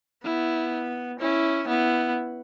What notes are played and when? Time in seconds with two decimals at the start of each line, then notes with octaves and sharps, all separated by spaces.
0.25 B3 E4
1.20 C#4 E4
1.68 B3 E4